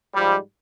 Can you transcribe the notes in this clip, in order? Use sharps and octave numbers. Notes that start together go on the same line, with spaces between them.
G#2 F3 G3